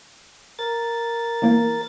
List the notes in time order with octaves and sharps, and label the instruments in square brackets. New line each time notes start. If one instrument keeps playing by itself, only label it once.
[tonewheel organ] A#4 A6
[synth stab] E3 A#3